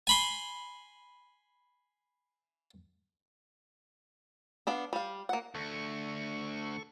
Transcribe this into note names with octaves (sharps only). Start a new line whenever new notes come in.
G#5 B5 C6
B3 D4 F5
G3 F5
A#3 F#5
D2 A4 C#6